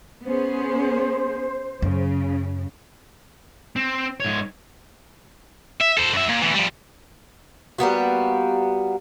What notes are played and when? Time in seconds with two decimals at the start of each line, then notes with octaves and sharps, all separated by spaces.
0.26 B3 C#4 G#4 C5
1.82 F#2 C#3
3.76 C4
4.20 G#2 C#5
5.80 E5
5.97 A4 C5
6.14 F#2 E5
6.29 A#2
6.42 D2 E3
6.55 F3 G3
7.78 G3 A#3 B3 F#4